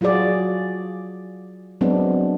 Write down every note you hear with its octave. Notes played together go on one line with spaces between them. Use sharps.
F#3 F4 F#4 G#4 D5
F#3 G#3 B3 C4 D4